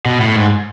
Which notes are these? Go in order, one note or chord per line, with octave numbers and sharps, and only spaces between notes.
B2
A2
G#2